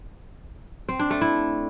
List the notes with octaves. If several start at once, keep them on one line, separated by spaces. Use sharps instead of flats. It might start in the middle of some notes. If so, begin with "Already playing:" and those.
C4
D4
A3
E4